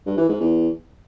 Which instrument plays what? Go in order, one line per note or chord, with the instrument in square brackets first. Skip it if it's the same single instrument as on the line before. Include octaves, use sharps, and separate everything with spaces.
[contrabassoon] G2
E3
G#2
E2